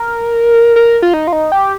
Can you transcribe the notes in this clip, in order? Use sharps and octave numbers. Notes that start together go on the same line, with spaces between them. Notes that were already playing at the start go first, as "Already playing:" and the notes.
Already playing: A#4
A#4
F4
D#4
F4
D#4
G4